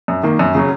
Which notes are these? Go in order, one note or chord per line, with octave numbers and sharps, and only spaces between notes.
F#2
D#3 A#3
F#2
C#3 F#3 C#4